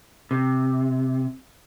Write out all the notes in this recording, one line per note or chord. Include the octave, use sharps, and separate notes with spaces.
C3